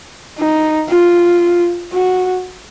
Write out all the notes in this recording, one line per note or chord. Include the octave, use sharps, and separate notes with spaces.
D#4
F4
F#4